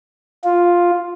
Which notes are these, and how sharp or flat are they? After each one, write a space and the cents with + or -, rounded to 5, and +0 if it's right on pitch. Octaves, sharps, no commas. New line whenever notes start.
F4 +5